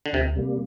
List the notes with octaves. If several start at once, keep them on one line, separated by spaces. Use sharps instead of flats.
D3
D2 C3
C3 G3 A#3